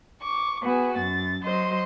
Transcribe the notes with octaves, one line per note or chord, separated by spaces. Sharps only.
C#6 D6
B3 F#4 G#4
F#2 A6
F#3 C5 D#5 C6